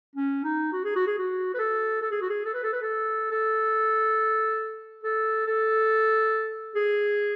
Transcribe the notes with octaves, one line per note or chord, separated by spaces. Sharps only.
C#4
D#4
F#4
G#4
F#4
G#4
F#4
B4
A4
A4
G#4
F#4
G#4
A4
B4
A4
B4
A4
A4
A4
A4
G#4